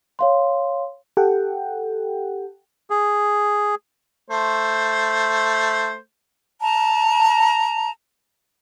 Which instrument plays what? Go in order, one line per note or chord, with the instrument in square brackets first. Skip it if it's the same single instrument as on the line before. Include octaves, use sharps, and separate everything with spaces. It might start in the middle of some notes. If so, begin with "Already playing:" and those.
[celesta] C#5 F5 C6
[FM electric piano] G4 A4 F#5 G5
[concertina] G#4
[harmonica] A3 C5
[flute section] A5 A#5